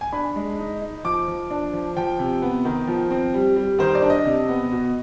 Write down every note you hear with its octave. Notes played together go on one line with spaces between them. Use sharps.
G#5
D4 B5
G#3
D#4
D#4
F3 D6
F3
D4
F3
F3 G5
C3
B3
D#3
F3
C4
G3
G3
D#3 C5
D5
D4
D#5
C3
B3
B2